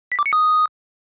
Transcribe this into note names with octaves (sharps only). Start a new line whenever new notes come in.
B6
D6
C#7
D#6